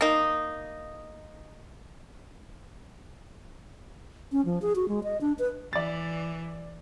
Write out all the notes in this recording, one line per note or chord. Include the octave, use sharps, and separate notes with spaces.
A#3 D#4
C#4
F3
G#4
F#4
G#3
D#5
D4
B4
E3 D5 A6